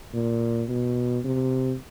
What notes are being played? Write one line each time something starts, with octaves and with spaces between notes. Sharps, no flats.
A#2
B2
C3